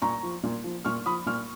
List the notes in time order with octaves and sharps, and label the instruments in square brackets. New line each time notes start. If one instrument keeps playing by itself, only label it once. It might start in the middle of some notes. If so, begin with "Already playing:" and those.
[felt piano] A#2 A#5 C#6
F3
A#2
F3
A#2 C#6 F6
F3 B5 D#6
A#2 C#6 F6